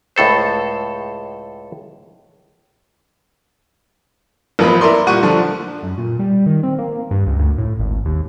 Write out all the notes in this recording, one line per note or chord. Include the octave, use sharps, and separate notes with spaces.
C#2 A2 A4 C5
A1 F3 A#3 B3 B5
E4 A#4 D5 C6
A#2 G3 F#5 C#6 D#7
D3 F3 D4
F#2
A#2
G3
D#3
C4
A#3
G2
C#2
D2
A2
G#1
D#2